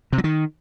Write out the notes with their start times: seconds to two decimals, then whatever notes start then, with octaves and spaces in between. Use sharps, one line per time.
0.13 C3
0.18 F#3
0.24 D#3